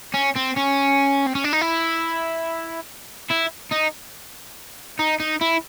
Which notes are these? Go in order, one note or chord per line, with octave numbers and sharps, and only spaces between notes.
C#4
C4
C#4
C4
C#4
D4
D#4
E4
E4
D#4
D#4
D#4
E4